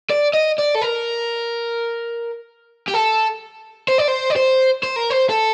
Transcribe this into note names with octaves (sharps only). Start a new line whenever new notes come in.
D5
D#5
D5
A4
A#4
G4
A4
C5
D5
C5
D5
C5
C5
A#4
C5
A4